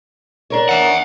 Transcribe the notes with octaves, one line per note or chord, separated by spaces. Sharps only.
D4 A#4 C#5
E5 F#5